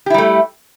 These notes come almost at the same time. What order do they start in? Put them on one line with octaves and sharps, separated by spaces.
G4 E4 G3 A3